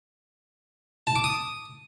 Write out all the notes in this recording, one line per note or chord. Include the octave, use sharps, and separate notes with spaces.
A5
D6
D#6